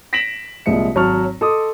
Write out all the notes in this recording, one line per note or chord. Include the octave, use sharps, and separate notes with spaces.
A#6 B6 D7 E7 F#7
C2 A#2 F3 G#3 E5 C#7
G#1 F#3 A5 C#6 F6
A4 D#5 C6 D6 D#6